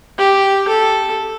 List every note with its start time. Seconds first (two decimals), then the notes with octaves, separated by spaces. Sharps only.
0.18 G4
0.68 A4